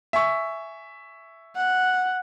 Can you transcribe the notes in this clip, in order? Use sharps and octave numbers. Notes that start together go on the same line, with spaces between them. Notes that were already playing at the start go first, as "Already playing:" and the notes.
E5 G#5 C#6
F#5